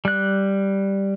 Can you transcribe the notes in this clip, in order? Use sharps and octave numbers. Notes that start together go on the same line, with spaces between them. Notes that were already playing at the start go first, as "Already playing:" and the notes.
G3 F#6